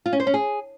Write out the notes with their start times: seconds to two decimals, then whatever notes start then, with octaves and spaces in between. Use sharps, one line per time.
0.06 F4
0.13 C#4
0.20 C5
0.27 C#4
0.34 G#4